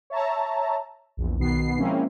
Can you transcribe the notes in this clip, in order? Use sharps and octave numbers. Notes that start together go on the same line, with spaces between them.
C#5 E5 A5 A#5
A#1 E2
B1 B2 D#3 B3 C7
F3 G#3 A#3 C4 C#4 E4